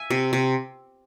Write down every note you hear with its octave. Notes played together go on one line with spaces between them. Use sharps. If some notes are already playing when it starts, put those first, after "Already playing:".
Already playing: E5 G#5
C3
C3